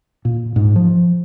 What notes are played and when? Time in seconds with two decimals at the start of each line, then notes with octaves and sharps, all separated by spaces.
0.25 A#2
0.56 G#2
0.76 F3